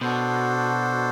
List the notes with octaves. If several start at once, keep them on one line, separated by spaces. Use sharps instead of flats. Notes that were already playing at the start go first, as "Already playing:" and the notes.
B2 D4 F#4 A4 C5